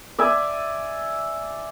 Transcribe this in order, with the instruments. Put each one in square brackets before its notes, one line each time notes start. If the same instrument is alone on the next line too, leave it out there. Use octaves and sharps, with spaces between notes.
[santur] D5 E5 G#5